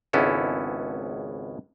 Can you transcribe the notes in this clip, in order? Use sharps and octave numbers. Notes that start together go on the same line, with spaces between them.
G#1 C#2 B3 C#4 E4 A4